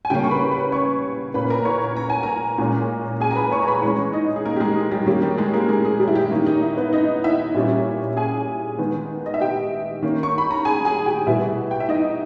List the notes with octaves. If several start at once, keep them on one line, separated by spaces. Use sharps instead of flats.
G#5
C#3 G3 A#3 C#4 G4 G5
C#6
B4 B5
B4 B5
C#5 C#6
A#2 A#3 C#4 B4 B5
A#4 A#5
C#5 C#6
A#5
G#5
A#4 A#5
A#2 G#3 C#4
G#4 G#5
A#5
B4 B5
C#5 C#6
A#5
B4 B5
E3 G#3 C#4 C#5 C#6
D#4 D#5
G#4
A#3 A#4
G4
G#3 G#4
G3 G4
D#3 G3 A#3 C#4 G4
G3 G4
G#3 G#4
A#3 A#4
G#3 G#4
G#3 G#4
G3 G4
E4
G3 G4
D#3 A#3 C#4 D#4
D#4
E4
B3 B4
D#4 D#5
E4 E5
A#2 G3 C#4
G#4 G#5
D#3 G#3 B3
D#5
E5
G4 G5
D#3 A#3 C#4
C#6
B5
A#5
G#4 G#5
G#4 G#5
G4 G5
B2 G3 B3 E4 E5
G5
E5
D#4 D#5